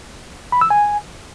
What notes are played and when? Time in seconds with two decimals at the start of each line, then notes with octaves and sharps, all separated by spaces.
0.52 B5
0.61 E6
0.70 G#5